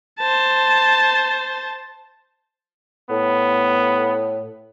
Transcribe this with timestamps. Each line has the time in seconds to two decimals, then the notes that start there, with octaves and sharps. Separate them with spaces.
0.19 C5 A5
3.10 A2 B3